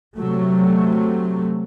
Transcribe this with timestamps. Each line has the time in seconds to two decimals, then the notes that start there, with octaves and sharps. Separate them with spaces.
0.17 C3 F#3 A3